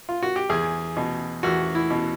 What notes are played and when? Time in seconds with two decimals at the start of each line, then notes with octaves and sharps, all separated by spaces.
0.09 F4
0.23 F#4
0.36 G4
0.49 E2 G#4
0.97 B2
1.43 E2 F#4
1.75 E4
1.91 B2